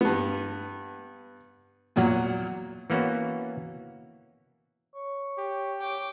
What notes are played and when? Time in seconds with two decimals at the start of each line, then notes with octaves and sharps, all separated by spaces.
0.01 G2 B3
1.96 E2 A#2 F#3 F#5
2.90 E3 A#3 B3 C#4 F#4
4.95 C#5
5.38 G4
5.80 C#5 G5 D6